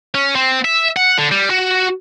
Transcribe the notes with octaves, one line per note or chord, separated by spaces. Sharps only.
C#4
C4
E5
F#5
D3
G3
F#4